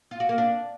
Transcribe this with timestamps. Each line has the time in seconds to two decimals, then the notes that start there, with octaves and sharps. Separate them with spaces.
0.11 F4
0.20 F#4
0.29 A#3
0.38 D4